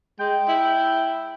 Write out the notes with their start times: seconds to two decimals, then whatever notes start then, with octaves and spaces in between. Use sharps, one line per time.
0.20 G#3 G5
0.48 E4